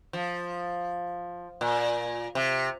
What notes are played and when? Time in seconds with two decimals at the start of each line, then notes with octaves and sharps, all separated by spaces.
0.13 F3
1.61 A#2
2.35 C3